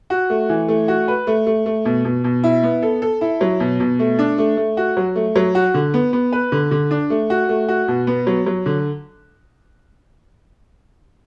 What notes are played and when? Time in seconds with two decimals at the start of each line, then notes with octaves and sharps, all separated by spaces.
0.10 F#4
0.30 A3
0.49 E3
0.68 A3
0.88 F#4
1.08 B4
1.27 A3
1.47 A3
1.66 A3
1.85 B2
2.05 B2
2.24 B2
2.44 E4
2.63 B3
2.82 A4
3.02 A4
3.21 E4
3.41 F#3
3.60 B2
3.80 B2
3.99 A3
4.19 D4
4.38 A3
4.57 A3
4.77 F#4
4.97 F#3
5.16 A3
5.36 F#3
5.55 F#4
5.74 D3
5.94 B3
6.13 B3
6.32 B4
6.52 D3
6.71 D3
6.91 D4
7.10 A3
7.30 F#4
7.49 A3
7.68 F#4
7.88 B2
8.07 B3
8.27 F#3
8.46 F#3
8.66 D3